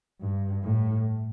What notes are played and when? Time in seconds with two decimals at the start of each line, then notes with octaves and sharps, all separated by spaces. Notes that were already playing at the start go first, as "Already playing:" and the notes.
0.20 G2
0.63 A2